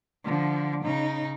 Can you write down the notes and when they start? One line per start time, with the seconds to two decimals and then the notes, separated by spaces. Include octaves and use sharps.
0.24 D3 F3
0.83 C#3 D#4